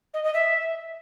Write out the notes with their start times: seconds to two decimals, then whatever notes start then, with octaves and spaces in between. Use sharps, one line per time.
0.14 D#5
0.24 D#5
0.34 E5